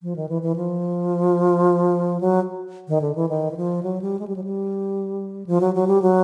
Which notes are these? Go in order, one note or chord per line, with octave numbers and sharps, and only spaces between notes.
F3
D#3
E3
E3
F3
F#3
D#3
D3
E3
D#3
E3
F3
F#3
G3
G#3
G3
F#3
G3
F3
F#3
F#3
G3
F#3